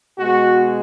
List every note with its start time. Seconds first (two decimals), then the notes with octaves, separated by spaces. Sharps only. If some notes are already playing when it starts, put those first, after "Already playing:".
0.19 B2 G#3 B3 F#4